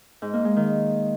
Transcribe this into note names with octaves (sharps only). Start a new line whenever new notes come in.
G#2
A#3
G#3
D#3